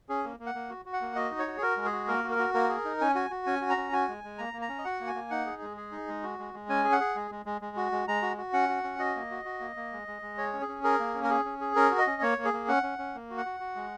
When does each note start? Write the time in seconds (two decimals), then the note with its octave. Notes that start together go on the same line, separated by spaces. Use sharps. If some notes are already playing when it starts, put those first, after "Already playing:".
0.09 C#4 G#4
0.24 A#3
0.40 A#3
0.46 F#5
0.55 A#3
0.69 F#4
0.85 F#4
0.93 F#5
1.01 A#3
1.15 F#4 D#5
1.31 D#4
1.39 C#5
1.47 F#4
1.57 G#4
1.62 F#4 A#4
1.77 G#3
1.85 G#4
1.92 F#4
2.08 A#3 A#4
2.24 F#4
2.31 A#4
2.39 F#4
2.54 A#3 A#4
2.69 G#4
2.85 D#4
3.01 C#4 G#5
3.15 F#4 G#5
3.30 F#4
3.46 C#4 G#5
3.61 F#4
3.70 A#5
3.77 C#4
3.92 F#4 G#5
4.08 G#3
4.24 G#3
4.38 A#3 A#5
4.53 A#3
4.61 A#5
4.69 C#4
4.78 D#5
4.85 F#4 F#5
5.00 A#3
5.07 G#5
5.15 A#3
5.31 D#4 F#5
5.46 G#4
5.62 G#3
5.77 G#4
5.92 D#4
6.08 G#3
6.23 F#4
6.39 G#3
6.54 G#3
6.69 C#4 G#5
6.84 G#4
6.92 F#5
7.00 G#4
7.16 G#3
7.31 G#3
7.46 G#3
7.61 G#3
7.76 F#4
7.92 G#3
8.08 G#3 A#5
8.22 F#4
8.37 F#4
8.53 C#4 F#5
8.69 F#4
8.83 C#4
8.99 F#4 D#5
9.15 A#3
9.31 F#4
9.45 F#4
9.60 A#3
9.76 A#3
9.92 G#3
10.08 G#3
10.22 G#3
10.38 G#4 C#5
10.53 C#4
10.61 G#4
10.68 C#4
10.84 G#4 A#4
10.99 A#3
11.14 C#4
11.24 A#4
11.30 G#4
11.45 C#4
11.61 G#4
11.75 C#4 A#4
11.91 F#4
11.98 D#5
12.07 C#4
12.22 A#3 C#5
12.38 A#3
12.45 G#4
12.53 A#3
12.68 C#4 F#5
12.83 C#4
12.99 C#4
13.14 A#3
13.30 F#4
13.38 F#5
13.46 F#4
13.60 F#4
13.75 G#3